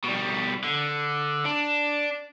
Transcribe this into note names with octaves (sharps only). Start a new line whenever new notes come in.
B2 G3
D3
D4